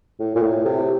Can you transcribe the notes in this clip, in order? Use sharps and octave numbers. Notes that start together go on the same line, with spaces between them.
A2
A#2
A2
C3